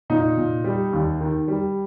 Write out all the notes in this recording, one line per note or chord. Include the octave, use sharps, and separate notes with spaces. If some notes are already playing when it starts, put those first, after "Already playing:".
A#2 D#4
A#2
G3
D#2
D#3
G3